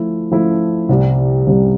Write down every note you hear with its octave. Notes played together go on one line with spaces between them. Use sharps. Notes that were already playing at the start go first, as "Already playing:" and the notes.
Already playing: F3 A3 E4
F3 A3 E4
C2 C3 G3
C2 C3 G3